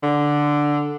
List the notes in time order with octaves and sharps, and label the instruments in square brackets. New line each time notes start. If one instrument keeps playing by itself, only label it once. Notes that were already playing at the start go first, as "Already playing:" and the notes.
[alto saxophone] D3